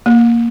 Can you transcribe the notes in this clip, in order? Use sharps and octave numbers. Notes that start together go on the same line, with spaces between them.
A#3